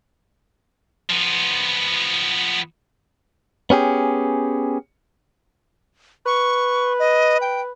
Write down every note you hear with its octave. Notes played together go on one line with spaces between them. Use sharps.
F3 B3
B3 C#4 G4 G#4
B4 C#6
D#5
G5